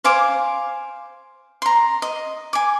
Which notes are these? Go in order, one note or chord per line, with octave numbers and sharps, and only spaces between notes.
C5 F5 G#5 D6
A#5 C6
D#5
G#5 D6